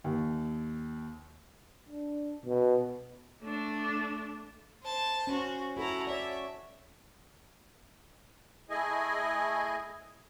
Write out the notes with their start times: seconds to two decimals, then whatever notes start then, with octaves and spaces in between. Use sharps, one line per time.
0.04 D#2
1.89 D4
2.45 B2
3.42 A3 D4
4.82 C5 A5
5.27 C#4 F#4 C5
5.77 E4 F#4 A4 A#5
6.07 C#5 D5 E5
8.70 A3 E4 G#4 D#5 G#5